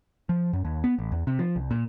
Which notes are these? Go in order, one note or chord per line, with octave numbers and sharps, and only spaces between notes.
F3
F#2
D#2
B3
A1
E2
C3
F3
C2
A#2